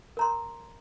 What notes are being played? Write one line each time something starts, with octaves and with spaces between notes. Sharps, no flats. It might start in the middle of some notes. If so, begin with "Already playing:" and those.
A#4 A#5 C6